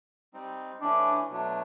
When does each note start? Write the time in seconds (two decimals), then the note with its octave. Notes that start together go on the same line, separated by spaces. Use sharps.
0.33 G3 C4 D#4
0.81 E3 A3 C#4 D4
1.29 B2 F#3 A3 D4